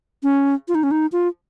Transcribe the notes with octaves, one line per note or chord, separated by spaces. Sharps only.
C#4
F4
D#4
C#4
D#4
F4